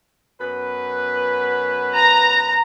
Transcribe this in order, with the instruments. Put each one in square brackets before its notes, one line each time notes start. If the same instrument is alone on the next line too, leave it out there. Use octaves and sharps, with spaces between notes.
[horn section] F#2 B3 B4
[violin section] A#5